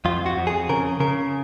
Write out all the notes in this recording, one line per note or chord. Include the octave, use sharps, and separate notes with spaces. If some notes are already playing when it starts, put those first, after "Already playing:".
F2 F4
F#4
F2
G#4
C#3 A#4
C#3 A#4